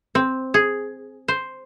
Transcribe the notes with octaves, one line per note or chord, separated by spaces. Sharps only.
C4
G#4
C5